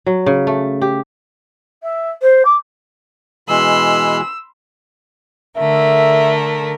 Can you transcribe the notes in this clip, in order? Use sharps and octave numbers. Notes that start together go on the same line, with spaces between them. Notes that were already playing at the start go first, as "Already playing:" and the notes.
F#3
C#3
A3
G4
E5
C5
D6
B2 E3 G#3 B5 C6 E6
D3 A3 A#4 E5